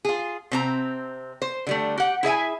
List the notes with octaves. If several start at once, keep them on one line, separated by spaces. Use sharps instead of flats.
F4 G#4
C3 C4 A#5
C5
D3 G3 A3
G4 F#5
E4 G#4 E5 G#5